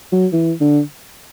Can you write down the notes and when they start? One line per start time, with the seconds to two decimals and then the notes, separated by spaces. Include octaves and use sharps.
0.12 F#3
0.33 E3
0.61 D3